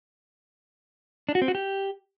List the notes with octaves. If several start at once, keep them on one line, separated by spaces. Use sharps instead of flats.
D4
F#4
C4
F#4
G4